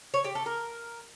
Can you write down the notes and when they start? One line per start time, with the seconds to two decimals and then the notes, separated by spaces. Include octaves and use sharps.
0.14 C#5
0.24 G4
0.35 A4
0.46 A#4